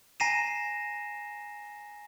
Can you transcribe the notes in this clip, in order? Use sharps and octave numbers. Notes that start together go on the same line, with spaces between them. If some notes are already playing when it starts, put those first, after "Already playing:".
G#5 A#5 A#6 C7 D#7 E7